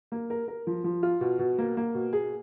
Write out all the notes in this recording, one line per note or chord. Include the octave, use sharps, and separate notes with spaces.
A#3
A#4
A#4
F3
F3
F4
B2
B2
A#3
A#3
B2
G#4